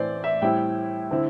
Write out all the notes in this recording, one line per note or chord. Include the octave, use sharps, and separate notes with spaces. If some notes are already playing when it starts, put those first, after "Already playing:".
Already playing: A2 E3 C4 C5 D5
E5
A2 G3 C4 E4 G5
D3 C4 E4